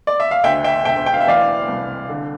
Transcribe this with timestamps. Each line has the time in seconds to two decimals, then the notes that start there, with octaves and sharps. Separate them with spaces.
0.07 D5
0.20 E5
0.31 F5
0.43 D2 E5 G5
0.64 E5 G5
0.85 E1 E5 G5
1.06 G5
1.13 F5
1.21 E5
1.27 E3 D5 F5
1.68 C2
2.09 D3